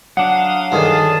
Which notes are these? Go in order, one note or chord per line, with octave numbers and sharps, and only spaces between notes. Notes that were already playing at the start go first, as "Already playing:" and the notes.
F#3 D4 F5 F#5 D#6
G2 D3 D#3 G#4 A5